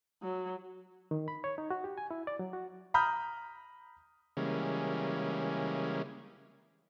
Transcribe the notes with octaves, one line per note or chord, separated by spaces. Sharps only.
F#3
D#3
B5
C#5
D#4
F#4
G4
G#5
E4
D5
F#3
F#4
A#5 B5 D#6 F6 G6
C#3 E3 G3 G#3 A#3 C#4